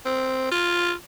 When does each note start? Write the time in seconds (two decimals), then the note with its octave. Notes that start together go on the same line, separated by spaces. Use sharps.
0.06 C4
0.52 F4